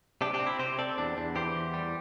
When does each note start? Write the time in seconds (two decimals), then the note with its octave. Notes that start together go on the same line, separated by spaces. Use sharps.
0.21 C3 D4 G4
0.34 D4 G4
0.40 C4
0.47 E4
0.59 C3 G4 C5
0.79 C4 A4 D5
0.98 E2 D4
1.17 E2 D4
1.36 E3 G4 C5
1.55 E2
1.74 G3